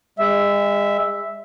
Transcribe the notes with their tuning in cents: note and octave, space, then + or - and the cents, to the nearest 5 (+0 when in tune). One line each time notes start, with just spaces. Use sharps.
G#3 -35 E5 +0